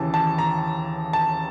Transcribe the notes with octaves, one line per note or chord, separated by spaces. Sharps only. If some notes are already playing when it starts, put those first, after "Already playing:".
Already playing: D#2 C#3 E3 A5
A5
A#5
A5